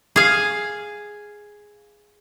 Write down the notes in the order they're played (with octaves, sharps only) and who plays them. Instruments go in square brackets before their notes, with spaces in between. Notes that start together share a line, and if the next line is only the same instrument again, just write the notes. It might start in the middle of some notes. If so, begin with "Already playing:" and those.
[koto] G#4 F5